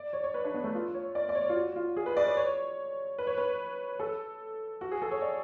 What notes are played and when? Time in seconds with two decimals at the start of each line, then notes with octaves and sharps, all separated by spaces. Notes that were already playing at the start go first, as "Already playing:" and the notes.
Already playing: D5
0.13 C#5
0.24 C#5
0.34 B4
0.44 D4
0.54 B3
0.64 A3
0.74 F4
0.94 C#5
1.15 D5
1.29 D5
1.35 C#5
1.49 F4
1.56 F#4
1.76 F4
1.97 G#4
2.06 B4
2.17 D5
2.26 C#5
2.37 C#5
3.18 B4
3.27 C#5
3.38 B4
3.99 A4
4.81 F#4
4.91 G#4
5.02 A4
5.12 C#5
5.22 D5